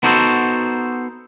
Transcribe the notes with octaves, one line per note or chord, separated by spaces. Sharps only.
B3 D#4 F#4 A4 C5